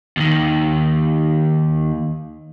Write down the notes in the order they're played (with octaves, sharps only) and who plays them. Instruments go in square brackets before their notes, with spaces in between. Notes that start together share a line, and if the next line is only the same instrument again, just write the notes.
[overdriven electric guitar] D#2 D#3